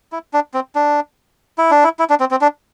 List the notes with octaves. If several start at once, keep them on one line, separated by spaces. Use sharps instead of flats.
E4
D4
C4
D4
E4
D4
E4
E4
D4
C4
C4
D4